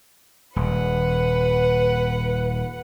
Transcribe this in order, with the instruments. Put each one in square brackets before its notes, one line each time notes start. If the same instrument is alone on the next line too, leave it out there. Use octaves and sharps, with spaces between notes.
[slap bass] D#1 [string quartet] B4 F#5